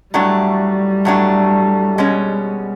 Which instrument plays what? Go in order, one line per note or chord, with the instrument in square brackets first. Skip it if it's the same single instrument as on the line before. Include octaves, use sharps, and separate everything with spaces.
[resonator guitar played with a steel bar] A2 F#3 A3 D4 [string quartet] G3
[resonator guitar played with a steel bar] A2 F#3 A3 D4
B2 G#3 C#4